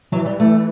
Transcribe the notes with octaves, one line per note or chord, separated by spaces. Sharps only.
E3 F#3
G3
A3